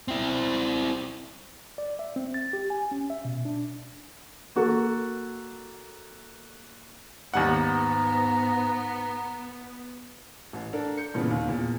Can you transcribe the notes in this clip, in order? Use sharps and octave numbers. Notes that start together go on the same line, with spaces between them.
C4 E4
D5
E5
C4
A6
G4
G#5
C#4
E5
B2
D4
A#3 F#4 A4 A#4
D#2 G#2 G3 B3 F#5 A#5
A1
D4 A4 A#4
G6 C#7
G2 A#2 C#3 E3 B3 D4
D#2
E2 A#2